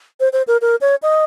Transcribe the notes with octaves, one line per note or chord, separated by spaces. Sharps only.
C5
C5
A#4
A#4
C#5
D#5